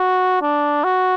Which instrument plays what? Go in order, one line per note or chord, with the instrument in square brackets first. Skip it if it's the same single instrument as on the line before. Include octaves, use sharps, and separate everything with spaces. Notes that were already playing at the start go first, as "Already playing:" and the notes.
Already playing: [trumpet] F#4
D4
F#4